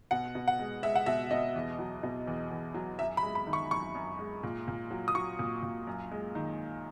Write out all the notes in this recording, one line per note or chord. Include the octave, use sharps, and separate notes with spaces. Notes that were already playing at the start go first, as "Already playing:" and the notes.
B2 F#5
B2
F#5
G#3
G#3 E5
F#5
B2 E5
B2 D#5
E2
F#3
B2
E2
E2
F#3
F#2 E5
B5
G#3
B5
D#3
C#6
F#2 C#6
F#2
G#3
A#2
A#2
F#3
D#6
F#3 C#6
A#2
A#2
F#2
G#3
D#3